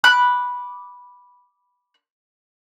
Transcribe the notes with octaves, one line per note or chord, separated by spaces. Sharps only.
B5 D6 F#6